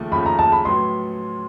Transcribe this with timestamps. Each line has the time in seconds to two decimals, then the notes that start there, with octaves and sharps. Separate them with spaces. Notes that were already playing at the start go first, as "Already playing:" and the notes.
Already playing: D#2 C#3 F3 A3
0.11 D#2 C#3 F3 A3 B5
0.26 A#5
0.39 A5
0.52 B5
0.65 A2 F#3 B3 C6